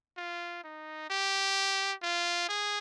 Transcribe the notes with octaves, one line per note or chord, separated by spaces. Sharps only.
F4
D#4
G4
F4
G#4